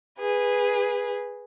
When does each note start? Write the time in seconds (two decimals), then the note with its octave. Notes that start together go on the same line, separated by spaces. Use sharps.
0.19 G#4 B4